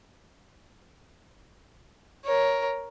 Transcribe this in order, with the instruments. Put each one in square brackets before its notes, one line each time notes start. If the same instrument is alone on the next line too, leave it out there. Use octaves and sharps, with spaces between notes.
[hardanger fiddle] A#4 C#5